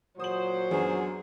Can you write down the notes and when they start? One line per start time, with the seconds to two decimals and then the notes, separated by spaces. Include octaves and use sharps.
0.20 A#2 F#3 C5 D#6 F#7
0.71 F#2 B3 D4 G#4